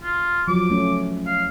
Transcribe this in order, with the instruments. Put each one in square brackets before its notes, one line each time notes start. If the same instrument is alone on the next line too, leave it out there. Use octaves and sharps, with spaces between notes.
[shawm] F4
[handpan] F3 F#3 [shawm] D6
[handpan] A3 C#4
[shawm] F5